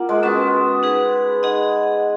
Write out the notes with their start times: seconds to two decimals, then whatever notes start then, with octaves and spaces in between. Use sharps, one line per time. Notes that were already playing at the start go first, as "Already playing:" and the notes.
Already playing: A#3 F4 F#5
0.09 G#3
0.23 B3 C#4 F#4 B4
0.83 D#4 G#4 B4
1.43 D#4 G#4 D#5 F#5